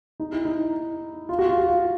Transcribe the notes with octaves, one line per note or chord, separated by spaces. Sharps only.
D#4
E4
D#4
F4
F#4
F4
F#4
F4